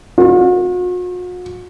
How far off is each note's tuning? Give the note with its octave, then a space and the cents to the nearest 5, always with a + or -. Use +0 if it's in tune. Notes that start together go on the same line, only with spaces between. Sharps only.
F#4 -45